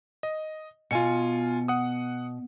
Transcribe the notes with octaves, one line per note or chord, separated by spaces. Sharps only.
D#5
B2 F4 G#5 C#7
F#5 D#6